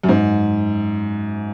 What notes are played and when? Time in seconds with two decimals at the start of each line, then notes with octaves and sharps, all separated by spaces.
0.03 F#2
0.09 G#2